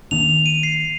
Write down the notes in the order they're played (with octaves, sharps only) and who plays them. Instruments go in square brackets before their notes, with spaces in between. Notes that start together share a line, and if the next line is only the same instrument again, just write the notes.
[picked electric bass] D#3 A#3 D4 [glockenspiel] F7
[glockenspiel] F7
D#7
C7